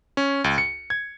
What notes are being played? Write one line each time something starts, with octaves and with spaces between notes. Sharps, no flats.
C#4
C#2
C#7
G#6